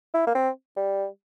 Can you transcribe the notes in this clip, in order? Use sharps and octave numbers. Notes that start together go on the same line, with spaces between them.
E4
A#3
C4
G3